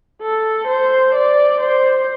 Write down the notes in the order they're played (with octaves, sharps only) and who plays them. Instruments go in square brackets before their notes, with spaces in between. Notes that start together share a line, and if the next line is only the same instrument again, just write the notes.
[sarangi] A4
C5
D5
C5